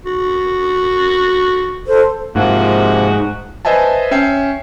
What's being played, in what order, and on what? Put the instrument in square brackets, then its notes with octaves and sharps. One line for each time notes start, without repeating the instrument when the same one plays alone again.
[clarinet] F#4
[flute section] A4 C5
[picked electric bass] G#2 [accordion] C3 F3 A#3 [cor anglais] F#4
[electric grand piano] B4 C5 D#5 E5 G#5 A5
C#4 E5 G5 C7